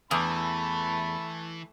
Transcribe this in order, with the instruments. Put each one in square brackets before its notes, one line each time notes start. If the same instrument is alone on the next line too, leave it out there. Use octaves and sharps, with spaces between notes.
[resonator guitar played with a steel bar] E2 [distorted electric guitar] E3 [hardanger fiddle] A3 [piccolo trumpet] B5